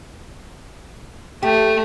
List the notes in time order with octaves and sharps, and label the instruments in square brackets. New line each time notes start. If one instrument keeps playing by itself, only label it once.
[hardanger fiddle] A3 [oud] G4